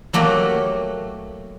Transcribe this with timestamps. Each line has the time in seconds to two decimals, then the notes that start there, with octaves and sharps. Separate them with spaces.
0.13 F#3 A3 A#3 F#4 G4